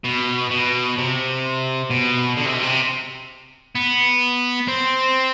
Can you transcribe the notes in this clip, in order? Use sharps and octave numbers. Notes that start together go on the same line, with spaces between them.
B2
B2
C3
B2
D3
C3
B2
C3
B3
C4